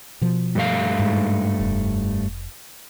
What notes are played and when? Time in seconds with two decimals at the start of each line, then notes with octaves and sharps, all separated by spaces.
0.21 B2 F3
0.55 G2 A3 F5
0.99 G#2
1.60 F1